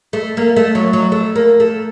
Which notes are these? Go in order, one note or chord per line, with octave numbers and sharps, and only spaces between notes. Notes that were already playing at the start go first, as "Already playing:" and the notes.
A3
A#3
A3
F#3
F#3
A3
A#3
A3